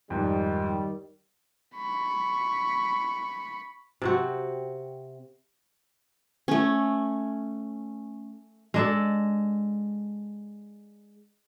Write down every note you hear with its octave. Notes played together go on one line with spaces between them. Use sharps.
F2 G#2 D#3 G3
B5 C#6
C3 C4 F#4
A3 C#4
G#3 D4 A4